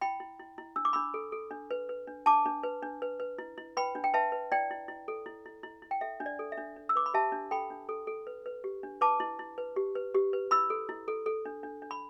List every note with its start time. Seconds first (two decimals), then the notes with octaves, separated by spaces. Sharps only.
0.01 E4 G5 B5
0.20 E4
0.40 E4
0.58 E4
0.76 D4 E6
0.85 D6
0.93 D4 B5 E6
1.14 A4
1.32 A4
1.51 D4
1.71 B4
1.89 B4
2.07 D4
2.26 D4 A5 D6
2.46 D4
2.63 B4
2.83 D4
3.02 B4
3.20 B4
3.38 E4
3.58 E4
3.77 B4 G5 B5
3.95 D4
4.04 G5
4.14 B4 E5 A5
4.32 B4
4.52 E4 D5 G5
4.71 E4
4.88 E4
5.08 A4
5.26 E4
5.46 E4
5.63 E4
5.82 E4
5.91 G5
6.01 A4 E5
6.20 D4
6.26 D5
6.39 A4
6.52 E5
6.57 D4
6.76 D4
6.89 E6
6.95 B4 D6
7.06 B5
7.14 G4 E5 A5
7.32 D4
7.51 A4 G5 B5
7.70 D4
7.89 A4
8.07 A4
8.27 B4
8.46 B4
8.64 G4
8.83 D4
9.01 B4 A5 D6
9.20 E4
9.39 E4
9.58 B4
9.76 G4
9.95 B4
10.15 G4
10.33 B4
10.51 E4 B5 E6
10.70 A4
10.89 E4
11.08 A4
11.26 A4
11.45 D4
11.63 D4
11.82 D4
11.91 B5